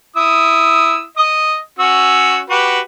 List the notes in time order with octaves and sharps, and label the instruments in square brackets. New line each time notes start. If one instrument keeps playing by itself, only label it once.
[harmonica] E4 D#6 E6
D#5 D#6
C#4 F#4 E6
F#4 G4 B4